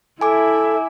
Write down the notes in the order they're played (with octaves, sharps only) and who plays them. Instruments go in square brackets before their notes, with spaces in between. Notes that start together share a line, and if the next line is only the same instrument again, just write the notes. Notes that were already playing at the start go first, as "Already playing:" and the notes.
[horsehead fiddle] E4 E5 [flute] A4 [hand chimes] G#5 D6